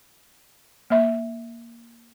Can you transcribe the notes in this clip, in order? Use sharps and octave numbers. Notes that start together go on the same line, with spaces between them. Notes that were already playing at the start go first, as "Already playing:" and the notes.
A#3 E5